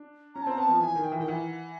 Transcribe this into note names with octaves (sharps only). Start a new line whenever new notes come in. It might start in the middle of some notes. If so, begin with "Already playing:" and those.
Already playing: D4
C#4 A#5
A5
C4 A#5
B3 A5
F3
E3 G#5
D#3
G5
E3
D#3 G5
E3 F#5